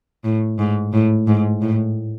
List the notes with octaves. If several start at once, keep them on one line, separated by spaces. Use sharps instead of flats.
A2
G#2
A2
G#2
A2